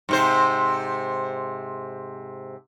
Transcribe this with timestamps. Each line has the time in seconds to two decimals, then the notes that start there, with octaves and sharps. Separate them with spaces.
0.09 G#2 C3 C5